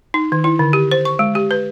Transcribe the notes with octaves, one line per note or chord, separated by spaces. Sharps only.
D#4
D#3
E4
D3
G4
C5
C#6
G#3
G4
B4